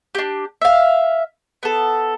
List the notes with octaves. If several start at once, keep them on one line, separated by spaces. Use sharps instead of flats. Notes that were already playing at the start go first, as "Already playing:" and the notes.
D4 G4
E5 F5
B3 A4